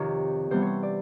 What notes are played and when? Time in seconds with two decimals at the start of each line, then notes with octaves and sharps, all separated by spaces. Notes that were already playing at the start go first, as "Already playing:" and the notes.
Already playing: F2 C3 D#3 G4 C#5
0.51 C3 E3 G3 B3 C5
0.62 C5 C#5
0.83 D5